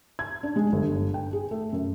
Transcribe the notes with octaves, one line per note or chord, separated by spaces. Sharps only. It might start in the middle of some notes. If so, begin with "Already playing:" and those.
G#6
D4
G#3
G1
G1
G5
G#4
A3
F#2